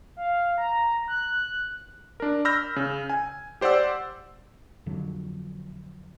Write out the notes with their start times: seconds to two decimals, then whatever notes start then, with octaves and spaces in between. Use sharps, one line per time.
0.17 F5
0.58 A#5
1.08 F#6
2.20 D4 A#4
2.45 B5 E6 F6 G6 A#6
2.76 C#3
3.10 G#5
3.61 G4 C5 D5 F#5 E6
4.86 F2 D3 F#3